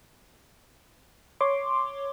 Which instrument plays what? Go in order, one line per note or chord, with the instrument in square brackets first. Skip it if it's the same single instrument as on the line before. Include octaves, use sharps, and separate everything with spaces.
[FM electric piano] C#5 C6 D6